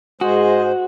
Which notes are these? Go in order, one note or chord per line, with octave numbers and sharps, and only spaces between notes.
G#2 G#3 F#4 G#4 C5 D#5